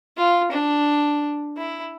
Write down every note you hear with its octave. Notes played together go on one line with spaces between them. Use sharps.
F4
D4
E4